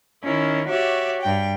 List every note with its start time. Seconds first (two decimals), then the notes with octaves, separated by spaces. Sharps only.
0.22 D#3 C#4 E4
0.67 F#4 G4 C#5 D5 E5
1.22 G2 G5